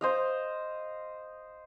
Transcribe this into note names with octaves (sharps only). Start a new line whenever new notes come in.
C5 D#5 F5